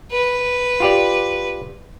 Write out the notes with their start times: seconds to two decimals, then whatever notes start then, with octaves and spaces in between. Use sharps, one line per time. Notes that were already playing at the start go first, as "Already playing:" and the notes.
0.11 B4
0.80 F4 G4 D5